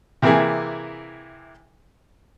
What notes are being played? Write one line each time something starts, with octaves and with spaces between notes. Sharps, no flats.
C3 E3 A#3 E4 G#4